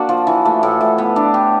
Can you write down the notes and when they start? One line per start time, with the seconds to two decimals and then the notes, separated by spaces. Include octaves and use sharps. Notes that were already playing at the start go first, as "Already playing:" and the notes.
Already playing: A#3 D4 F#4
0.09 F3
0.27 E3
0.45 A3
0.63 A2
0.81 A2
0.98 B3
1.16 D4
1.34 G4